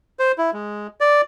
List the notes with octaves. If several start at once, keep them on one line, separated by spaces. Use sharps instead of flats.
C5
E4
G#3
D5